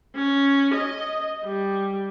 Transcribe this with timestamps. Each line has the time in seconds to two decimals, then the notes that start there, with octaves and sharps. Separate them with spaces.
0.15 C#4
0.74 D#5
1.44 G3